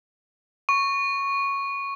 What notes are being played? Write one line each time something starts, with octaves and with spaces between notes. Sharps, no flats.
C#6